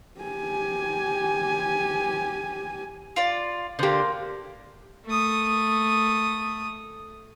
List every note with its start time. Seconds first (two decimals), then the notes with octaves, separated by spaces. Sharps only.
0.21 G4 G#5
3.16 F4 D5
3.79 D3 A#3 G4 C5
5.05 A3 D#6